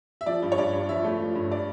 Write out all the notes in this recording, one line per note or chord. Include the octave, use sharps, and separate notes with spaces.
E5
F3 D5
G2
C#5
G2 D5
G2
F3 E5
A3
F3
G2
D5